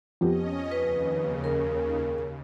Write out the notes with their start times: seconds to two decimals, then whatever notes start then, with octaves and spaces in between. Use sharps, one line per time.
0.21 F2 B3 C#4 G4 D#5
0.72 D#2 C#3 B4
1.44 A#4